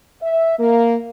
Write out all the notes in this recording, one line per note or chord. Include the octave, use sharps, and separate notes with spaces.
E5
A#3